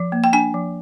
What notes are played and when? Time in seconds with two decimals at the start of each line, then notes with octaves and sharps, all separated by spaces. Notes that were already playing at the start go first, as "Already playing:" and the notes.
Already playing: F3
0.12 A#3
0.24 G5
0.33 D4 G#5
0.54 F3